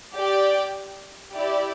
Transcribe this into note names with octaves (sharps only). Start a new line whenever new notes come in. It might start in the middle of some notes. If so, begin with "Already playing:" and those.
G4 D5 G5
E4 G4 D5